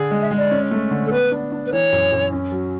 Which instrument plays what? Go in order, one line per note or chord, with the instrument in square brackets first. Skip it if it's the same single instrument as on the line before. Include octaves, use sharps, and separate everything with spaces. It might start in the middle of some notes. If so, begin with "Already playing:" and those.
Already playing: [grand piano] D3 G#4
G#3
[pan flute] E5
[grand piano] G#3
[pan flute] D5
[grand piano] C#4
A3
D3
[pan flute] A4
[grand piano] B3 [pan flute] B4
[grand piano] D4
D4
[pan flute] B4
[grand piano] E3 [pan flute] C#5
[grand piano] F#2
F#2
C#4
F#3